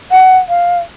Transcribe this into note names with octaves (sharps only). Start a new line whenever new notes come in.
F#5
F5